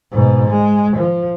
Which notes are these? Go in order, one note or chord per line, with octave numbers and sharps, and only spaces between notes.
G#2 B2
G#3
F3